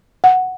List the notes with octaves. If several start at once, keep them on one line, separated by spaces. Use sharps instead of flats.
F#5